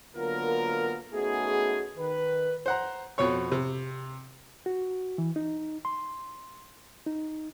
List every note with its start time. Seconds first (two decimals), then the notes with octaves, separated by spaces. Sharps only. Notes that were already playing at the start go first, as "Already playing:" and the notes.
0.15 D3 F#3 A#3 B3 F4 A#4
1.13 A3 B3 C#4 D#4 F#4 G#4
1.97 D#3 B4
2.66 C5 F#5 A#5
3.18 F2 B2 C#5 C#6
3.52 C3
4.66 F#4
5.18 E3
5.36 D#4
5.85 C6
7.06 D#4